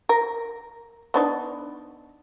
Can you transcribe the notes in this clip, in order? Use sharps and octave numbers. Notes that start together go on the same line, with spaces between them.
A#4
B3 D4 D#4